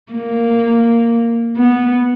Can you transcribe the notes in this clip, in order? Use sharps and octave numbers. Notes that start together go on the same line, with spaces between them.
A#3
B3